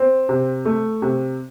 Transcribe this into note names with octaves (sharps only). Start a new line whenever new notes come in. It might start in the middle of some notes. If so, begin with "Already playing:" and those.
Already playing: C4
C3
A3
C3